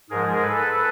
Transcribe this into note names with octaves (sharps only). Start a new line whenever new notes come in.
G#2 F3 G#3 G#4 A#4
A4 B4